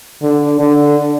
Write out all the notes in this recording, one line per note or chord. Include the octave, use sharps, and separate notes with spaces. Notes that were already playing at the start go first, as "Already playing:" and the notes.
D3
D3